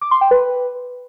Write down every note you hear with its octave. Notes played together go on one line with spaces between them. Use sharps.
D6
C6
G5
B4